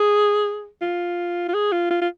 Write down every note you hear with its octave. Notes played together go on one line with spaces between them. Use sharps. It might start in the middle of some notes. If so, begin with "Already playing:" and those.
Already playing: G#4
F4
F4
G#4
F4
F4
F4